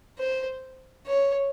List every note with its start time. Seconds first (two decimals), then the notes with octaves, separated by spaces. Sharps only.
0.18 C5
1.06 C#5